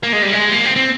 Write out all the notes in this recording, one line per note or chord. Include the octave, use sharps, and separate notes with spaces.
A#3
G#3
G3
G#3
A#3
C4
C4